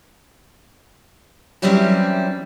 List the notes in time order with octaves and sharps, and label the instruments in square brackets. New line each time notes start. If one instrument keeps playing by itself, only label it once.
[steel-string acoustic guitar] E3 F#3 G3 C4 C#4 E4